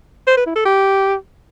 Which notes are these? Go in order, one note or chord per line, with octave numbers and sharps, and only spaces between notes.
C5
B4
E4
A4
G4